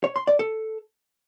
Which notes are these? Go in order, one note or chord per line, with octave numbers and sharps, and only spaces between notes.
C#5
C6
D5
A4